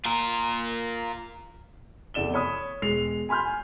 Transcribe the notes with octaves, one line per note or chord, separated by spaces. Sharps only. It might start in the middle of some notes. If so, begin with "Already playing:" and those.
F4 A#4
F1 E2 D5 E7 G7
C#5 B5 D#6
E1 G#3 C7 F7
G#5 B5 C6 F6 G6
G#5